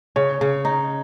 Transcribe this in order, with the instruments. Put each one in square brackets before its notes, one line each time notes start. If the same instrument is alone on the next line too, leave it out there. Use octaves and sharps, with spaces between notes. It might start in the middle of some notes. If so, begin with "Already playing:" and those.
[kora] C#3 [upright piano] C#5
[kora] C#3
D#4